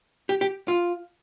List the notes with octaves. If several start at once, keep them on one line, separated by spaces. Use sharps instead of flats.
G4
G4
F4